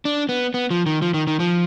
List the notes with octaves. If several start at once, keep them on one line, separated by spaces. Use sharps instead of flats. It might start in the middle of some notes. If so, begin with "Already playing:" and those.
D4
B3
B3
F3
D#3
F3
D#3
D#3
F3